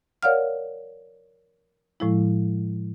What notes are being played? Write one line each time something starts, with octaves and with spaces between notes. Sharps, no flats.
A#4 C#5 D5 F5 F#5 F6
A2 F3 G#3 E4